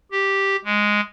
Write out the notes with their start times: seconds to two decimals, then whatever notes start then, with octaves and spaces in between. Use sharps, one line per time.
0.12 G4
0.65 G#3